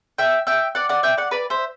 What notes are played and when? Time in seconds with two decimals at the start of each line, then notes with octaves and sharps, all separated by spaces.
0.18 E5 G5
0.47 E5 G5
0.75 D5 F#5
0.89 D5 F#5
1.03 E5 G5
1.17 D5 F#5
1.31 B4 D5
1.50 C5 E5